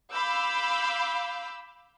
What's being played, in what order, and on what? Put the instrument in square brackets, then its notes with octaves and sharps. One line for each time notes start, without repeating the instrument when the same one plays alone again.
[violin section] F5 B5 D6 E6 G6